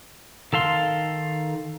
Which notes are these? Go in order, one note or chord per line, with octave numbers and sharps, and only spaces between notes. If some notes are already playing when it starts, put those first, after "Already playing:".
D#3 A4 F5 C6